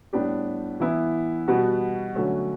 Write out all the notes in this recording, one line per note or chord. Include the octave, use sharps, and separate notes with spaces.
A2 G3 B3 D4 G4
E3 B3 E4
B2 G3 B3 F#4
D3 F#3 A3 C#4 F#4